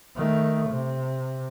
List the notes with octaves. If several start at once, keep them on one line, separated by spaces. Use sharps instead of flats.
D#3 A3
C3